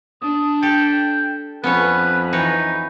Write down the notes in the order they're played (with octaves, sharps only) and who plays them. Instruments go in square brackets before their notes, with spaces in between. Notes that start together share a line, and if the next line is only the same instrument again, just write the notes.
[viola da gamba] D4 [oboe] D#6
[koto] G4 A4 [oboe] G5
[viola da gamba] F2 [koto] B3 C#4 C#5 [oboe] B4
[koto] E3 B4 C#5 [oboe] D#4